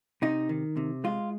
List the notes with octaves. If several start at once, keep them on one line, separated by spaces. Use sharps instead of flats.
C3 D#4
D#3
C3
G#3 F4